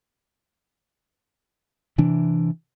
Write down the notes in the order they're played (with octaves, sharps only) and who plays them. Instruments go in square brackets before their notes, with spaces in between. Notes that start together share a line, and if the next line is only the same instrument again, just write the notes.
[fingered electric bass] C3 E3 D4